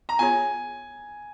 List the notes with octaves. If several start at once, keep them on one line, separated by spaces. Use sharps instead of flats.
A#5
B3 F4 G#4 C#5 G#5